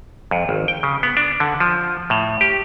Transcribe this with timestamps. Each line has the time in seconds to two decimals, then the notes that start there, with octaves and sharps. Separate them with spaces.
0.31 F2
0.49 G#1
0.68 G5
0.83 C#3
1.03 B3
1.17 D4
1.40 D3
1.60 F3
2.10 A2
2.41 G4